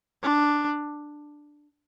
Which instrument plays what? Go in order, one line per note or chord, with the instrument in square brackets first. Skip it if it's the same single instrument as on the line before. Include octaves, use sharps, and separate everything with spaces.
[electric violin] D4